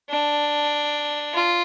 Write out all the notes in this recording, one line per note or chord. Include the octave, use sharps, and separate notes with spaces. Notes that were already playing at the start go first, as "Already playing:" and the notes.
D4
F4